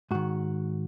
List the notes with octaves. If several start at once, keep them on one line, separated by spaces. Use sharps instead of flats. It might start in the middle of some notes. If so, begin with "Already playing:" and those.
G#2 D#3 F#4